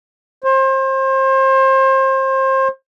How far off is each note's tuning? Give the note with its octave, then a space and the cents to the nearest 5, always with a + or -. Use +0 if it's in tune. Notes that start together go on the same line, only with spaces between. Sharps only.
C5 +30